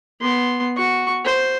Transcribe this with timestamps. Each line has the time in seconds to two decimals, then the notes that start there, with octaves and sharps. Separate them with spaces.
0.21 B3 C6
0.77 F#4 C#6
1.25 C5